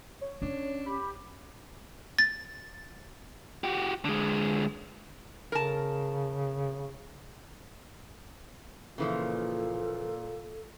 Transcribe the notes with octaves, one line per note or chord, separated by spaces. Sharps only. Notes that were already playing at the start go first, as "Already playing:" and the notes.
C#5
C#4 D4
G4 B5
A6
F#4 G4
D3 G#3
C#3 A#4 A5
A#2 C#3 E3 F3 F4 A4